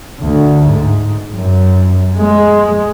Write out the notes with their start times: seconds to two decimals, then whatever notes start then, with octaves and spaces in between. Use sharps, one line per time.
0.20 D2
0.67 G#2
1.35 F#2
2.17 G#3